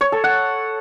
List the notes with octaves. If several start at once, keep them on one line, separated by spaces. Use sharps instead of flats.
C#5
A4
F#5